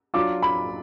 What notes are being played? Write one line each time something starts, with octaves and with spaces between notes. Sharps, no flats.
F#3 D4 F4 D6
B5